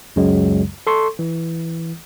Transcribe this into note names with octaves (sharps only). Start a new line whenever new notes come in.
C#2 F#2 C#3 F#3 G#3
A4 C6 C#6
E3